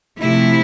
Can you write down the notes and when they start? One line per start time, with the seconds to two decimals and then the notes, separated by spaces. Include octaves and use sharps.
0.19 C3 F3 A3 E4